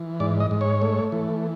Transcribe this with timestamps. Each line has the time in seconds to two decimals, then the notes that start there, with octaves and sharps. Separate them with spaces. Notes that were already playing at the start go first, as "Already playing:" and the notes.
Already playing: E3
0.20 G#2 D5
0.40 D#5
0.51 G#2
0.61 C#5
0.82 A3
1.12 E3